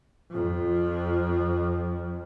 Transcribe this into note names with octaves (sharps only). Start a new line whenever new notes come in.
F2 F3